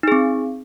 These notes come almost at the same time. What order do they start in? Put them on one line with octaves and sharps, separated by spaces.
D#4 G#4 C4